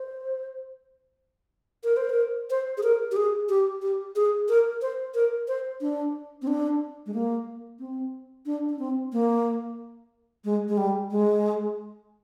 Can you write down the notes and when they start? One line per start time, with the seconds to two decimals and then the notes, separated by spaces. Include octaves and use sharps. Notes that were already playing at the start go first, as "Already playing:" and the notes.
Already playing: C5
1.84 A#4
1.97 C5
2.09 A#4
2.50 C5
2.78 G#4
2.83 A#4
3.12 G4
3.16 G#4
3.49 G4
3.82 G4
4.16 G#4
4.49 A#4
4.82 C5
5.15 A#4
5.48 C5
5.81 D4
6.42 C4
6.47 D4
7.06 G#3
7.14 A#3
7.79 C4
8.46 D4
8.69 D4
8.79 C4
9.12 A#3
10.45 G#3
10.69 G#3
10.78 G3
11.11 G#3